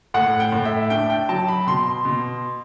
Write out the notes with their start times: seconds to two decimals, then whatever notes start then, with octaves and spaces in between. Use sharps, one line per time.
0.14 A2 F#5
0.40 G5
0.52 A2
0.65 E5
0.90 D4 G5
1.10 G5
1.29 F#3 A5
1.48 B5
1.67 B2 C6
2.05 B2